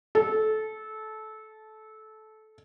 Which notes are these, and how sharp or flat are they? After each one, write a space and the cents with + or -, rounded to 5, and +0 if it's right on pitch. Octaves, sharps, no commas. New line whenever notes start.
A4 -20